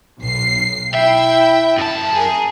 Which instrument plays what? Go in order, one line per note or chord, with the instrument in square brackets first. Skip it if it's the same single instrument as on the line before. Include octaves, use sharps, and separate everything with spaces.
[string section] B1 C7
[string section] E4 G5 [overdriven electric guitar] E5
[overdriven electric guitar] F#2 A5
[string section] G#4 A#4